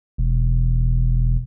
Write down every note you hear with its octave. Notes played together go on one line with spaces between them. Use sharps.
E1